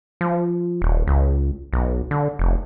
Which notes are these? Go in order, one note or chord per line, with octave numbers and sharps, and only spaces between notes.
F3
D#1
C#2
B1
D3
F1